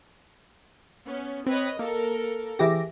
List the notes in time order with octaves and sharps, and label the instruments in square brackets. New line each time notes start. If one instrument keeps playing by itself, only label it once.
[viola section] B3 C#4
[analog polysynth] C4 [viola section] B4 C#5 D#5
[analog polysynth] A#3 [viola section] A4 A#4
[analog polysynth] E3 D6 A#6 [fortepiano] G4 G#4 E5